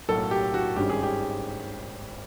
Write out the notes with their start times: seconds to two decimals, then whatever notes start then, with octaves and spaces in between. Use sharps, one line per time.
0.09 B1 A2 F#3 A#3 A4
0.31 G4
0.54 F#4
0.76 G#1 G2 D#3 G#3 C#4 G4
0.89 G#4
1.03 G4